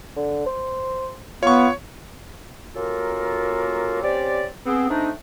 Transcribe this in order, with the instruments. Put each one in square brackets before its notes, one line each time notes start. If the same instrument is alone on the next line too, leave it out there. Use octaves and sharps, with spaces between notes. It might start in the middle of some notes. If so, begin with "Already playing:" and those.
[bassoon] D3
C5
[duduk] B3 [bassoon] F4 [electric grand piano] C#5 C#6
[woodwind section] A#3 C#4 F4 F#4 A4 A#4
C4 C#4 G4 D5
B3 C4 G#4
A3 C4 D4 D#4